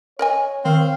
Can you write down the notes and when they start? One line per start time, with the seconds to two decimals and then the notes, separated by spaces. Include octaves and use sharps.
0.19 A#4 C#5 D#5 G#5
0.65 D#3 C4 F5